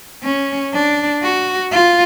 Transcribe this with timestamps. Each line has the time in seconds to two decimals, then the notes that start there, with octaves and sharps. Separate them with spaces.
0.24 C#4
0.74 D4
1.23 F#4
1.72 F4